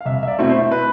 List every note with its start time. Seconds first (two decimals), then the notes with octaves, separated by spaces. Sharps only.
0.01 F5
0.05 C2 E5
0.23 E5
0.28 D5
0.39 B2 A3 C4 E4
0.49 C5
0.72 B4